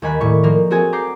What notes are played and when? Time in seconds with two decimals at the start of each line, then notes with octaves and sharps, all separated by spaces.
0.02 D#2 D#3 G#5 B5 F#6
0.20 A2 D#3 D5 C#6
0.43 F3 A#3 A#4
0.71 C4 F#4 G#4 G#5 A6
0.93 A#5 D6 G6 C7